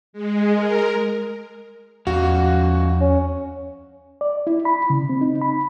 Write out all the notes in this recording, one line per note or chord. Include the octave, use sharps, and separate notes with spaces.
G#3
A#4
E2 F3 C#4 F#4 F5
C#4
D5
E4
B5
C#3
C4
D#4
B5